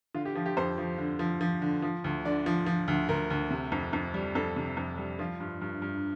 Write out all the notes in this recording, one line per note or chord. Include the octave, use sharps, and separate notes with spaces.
D3 F4
G4
F3 F4
G4
F2 C5
F3
D3
F3
F3
D3
F3
D2
D3 D5
F3
F3
D2
D2 A#4
D2
C3
F2
F2
G3
F2 A4
C3
F2
G3
F3 F4
G2
G2
G2